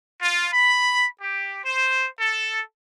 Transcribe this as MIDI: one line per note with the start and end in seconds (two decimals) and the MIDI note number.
0.22 0.49 65
0.52 1.07 83
1.21 1.60 67
1.65 2.08 72
2.19 2.63 69